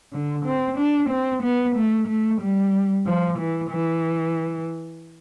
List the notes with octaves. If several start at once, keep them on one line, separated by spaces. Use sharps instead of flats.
D3
C4
D4
C4
B3
A3
A3
G3
F3
E3
E3